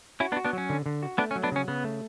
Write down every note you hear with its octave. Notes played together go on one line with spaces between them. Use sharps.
C#4 E4 F#4
B3 D4
F#4
B3 D4
F#3 C#4
D3
D3
F#4
A3 B3 D4
C#4
F#3
B3 D4
C#3 C#4
C#3 B3
A3